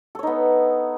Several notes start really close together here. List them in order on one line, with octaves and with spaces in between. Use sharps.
A4 C#5 D#4 B3